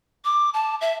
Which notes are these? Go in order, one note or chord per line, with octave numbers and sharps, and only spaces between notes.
D6
A5
E5